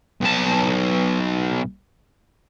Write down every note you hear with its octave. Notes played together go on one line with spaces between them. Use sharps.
B1 A5